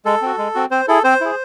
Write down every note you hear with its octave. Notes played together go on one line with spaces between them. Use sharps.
G#3 A4
C4 F#4
G#3
C4 F#4
C4 C5
E4 G#4 A4
C4 C5
E4 G#4